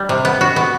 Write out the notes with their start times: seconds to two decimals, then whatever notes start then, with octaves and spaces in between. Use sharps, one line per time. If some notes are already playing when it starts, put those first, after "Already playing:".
Already playing: G3
0.09 C3
0.25 B3
0.41 F#4
0.56 B3